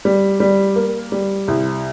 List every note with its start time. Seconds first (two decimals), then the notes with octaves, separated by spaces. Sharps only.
0.05 G3
0.40 G3
0.76 A#3
1.12 G3
1.48 C2